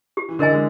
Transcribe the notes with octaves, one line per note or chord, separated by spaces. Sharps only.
G4
E3
D3 A#4 D#5 G#5
G#3